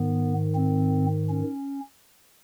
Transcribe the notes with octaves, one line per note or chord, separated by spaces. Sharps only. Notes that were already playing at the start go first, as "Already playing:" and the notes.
Already playing: G#2 D#3 B3
C4
C#4